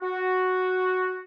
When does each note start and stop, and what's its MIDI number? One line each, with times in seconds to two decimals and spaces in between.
0.02 1.21 66